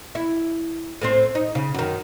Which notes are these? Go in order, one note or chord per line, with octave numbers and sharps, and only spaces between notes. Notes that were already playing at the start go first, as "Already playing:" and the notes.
E4
A2 C4 C5
D#4
C#3
F#2 D#3